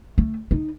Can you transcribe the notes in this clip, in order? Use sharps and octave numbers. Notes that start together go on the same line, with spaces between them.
A3
D#4